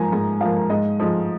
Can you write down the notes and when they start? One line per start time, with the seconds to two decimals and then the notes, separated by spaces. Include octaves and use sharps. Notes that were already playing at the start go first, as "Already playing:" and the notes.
Already playing: G#2 F3 A#3 G#5 A#5
0.12 G#2
0.41 F3 A#3 F5
0.70 G#2 D#5
1.00 F3 G#3